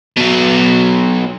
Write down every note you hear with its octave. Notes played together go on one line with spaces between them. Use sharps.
B2 F#3